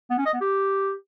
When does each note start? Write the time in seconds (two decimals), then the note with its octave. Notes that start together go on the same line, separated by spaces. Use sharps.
0.10 B3
0.18 C#4
0.26 D#5
0.33 B3
0.41 G4